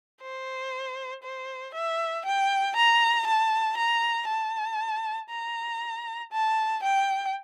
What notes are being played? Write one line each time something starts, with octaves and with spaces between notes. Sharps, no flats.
C5
C5
E5
G5
A#5
A5
A#5
A5
A#5
A5
G5